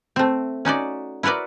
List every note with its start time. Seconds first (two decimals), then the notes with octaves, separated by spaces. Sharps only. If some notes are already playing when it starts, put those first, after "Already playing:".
0.16 A3 C4
0.65 C#4 D#4 F#4 D5
1.23 E4 F#4 A#4 B4 D5